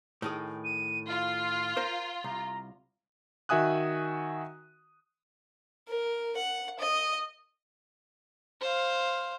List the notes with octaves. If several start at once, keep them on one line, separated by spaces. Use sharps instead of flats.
A2 D#3 G#4
D#7
F4 F6
A#4 C5
C2 A#5
D#3 F#4 E5 G#5 D#6 F#6
A#4
F#5
D#5
C5 F5